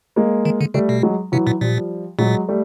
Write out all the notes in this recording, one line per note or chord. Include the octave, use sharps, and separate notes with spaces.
G#3 A#3
D#3
D3
C#3 G3 A3
B2
F#3 G#3
C3 E3 F#3
A#2
A#2 F3 G3
A#2 F#3 G#3
G3 A3